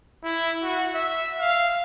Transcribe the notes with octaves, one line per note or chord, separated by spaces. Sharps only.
E4
F#4
E5
F5